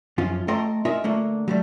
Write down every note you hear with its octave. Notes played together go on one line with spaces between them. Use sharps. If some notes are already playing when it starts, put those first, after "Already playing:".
F#2 F3 C#4 F4
A3 A4 D#5 G5 A#5 C6
C#4 D#4 F4 A#4 D#5 E5
D3 A3 A#3
F#3 G3 A3